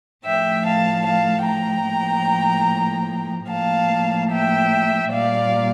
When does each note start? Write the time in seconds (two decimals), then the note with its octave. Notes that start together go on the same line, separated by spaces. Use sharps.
0.25 A2 F3 A3 E5 G5
0.66 F5 A5
1.06 F5 A5
1.47 G5 A#5
1.88 A2 F3 A#3
3.50 A2 F3 A#3 F5 A5
4.31 E5 G5
5.13 A#2 G3 A#3 D5 F5